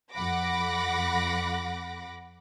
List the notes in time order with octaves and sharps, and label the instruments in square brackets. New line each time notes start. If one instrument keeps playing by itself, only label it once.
[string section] F2 F#5 B5 D6 A#6